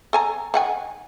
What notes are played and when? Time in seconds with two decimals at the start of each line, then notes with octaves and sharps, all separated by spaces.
0.13 A4 G#5 A#5
0.54 D#3 F#5 G#5